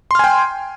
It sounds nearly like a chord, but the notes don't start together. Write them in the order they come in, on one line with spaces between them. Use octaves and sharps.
C6 F6 G#5 G5